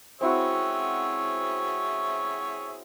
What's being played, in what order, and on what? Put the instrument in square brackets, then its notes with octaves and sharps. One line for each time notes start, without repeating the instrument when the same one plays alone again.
[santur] C4 E4 F#4 [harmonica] G#4 C#5 E5